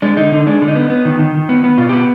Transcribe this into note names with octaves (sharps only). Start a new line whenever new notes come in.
G#3 D4
D3 D#4
D3 D#4
G#3 D4
D3
D#4
B3
B3
D#3
D#3
D#3
B3
B3
B2 F4
B3 G4